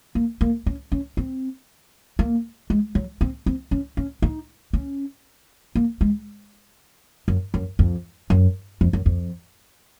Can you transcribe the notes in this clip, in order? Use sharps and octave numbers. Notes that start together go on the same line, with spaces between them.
A#3
A#3
C#4
C#4
C4
A#3
G#3
F#3
C4
C4
C#4
C#4
D#4
C#4
A#3
G#3
F#2
F#2
F2
F#2
F2
F#2
F2